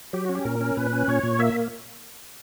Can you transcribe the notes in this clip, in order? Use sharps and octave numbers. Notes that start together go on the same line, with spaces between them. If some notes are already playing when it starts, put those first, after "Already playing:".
F#3 G4
C#4 F#4
G4
A#2 A#4
C#4
A#2 B4
C#4
A#2 C#5
A#2
A#3 E5